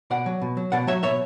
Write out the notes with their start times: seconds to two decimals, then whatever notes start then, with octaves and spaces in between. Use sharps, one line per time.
0.10 B2 D5 F#5
0.26 F#3
0.42 B2
0.57 F#3
0.72 B2 D5 F#5
0.87 F#3 C#5 E5
1.03 B2 C#5 E5